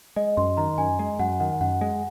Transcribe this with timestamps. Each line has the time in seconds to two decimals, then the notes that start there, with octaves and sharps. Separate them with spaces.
0.16 G#3 D#5
0.37 F#2 C6
0.57 D#3 A#5
0.78 F#2 G#5
0.99 G#3
1.19 F#2 F#5
1.40 D#3 F#5
1.61 F#2 F#5
1.81 G#3